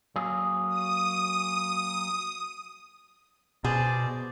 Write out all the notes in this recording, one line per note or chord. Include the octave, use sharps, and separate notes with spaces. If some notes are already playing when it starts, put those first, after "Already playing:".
F#3 A#3 G#4
D#6
B2 G#4 C5 D5